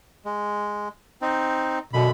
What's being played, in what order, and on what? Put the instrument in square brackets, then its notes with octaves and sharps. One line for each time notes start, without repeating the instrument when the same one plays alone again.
[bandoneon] G#3
C4 D#4
[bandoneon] F#2 D3 B5 [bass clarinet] B2